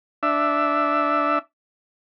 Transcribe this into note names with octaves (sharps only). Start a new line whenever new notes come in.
D4 E5